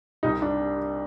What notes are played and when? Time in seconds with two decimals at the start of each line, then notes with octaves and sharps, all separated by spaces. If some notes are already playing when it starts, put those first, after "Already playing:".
0.23 C2 C3 G3 D#4
0.42 D4